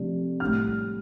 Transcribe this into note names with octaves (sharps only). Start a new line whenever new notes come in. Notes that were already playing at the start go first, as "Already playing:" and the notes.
Already playing: C3 F3 A3 D4
A2 G3 D4 F6